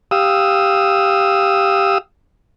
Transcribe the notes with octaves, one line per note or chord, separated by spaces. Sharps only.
G4 F5 D#6 E6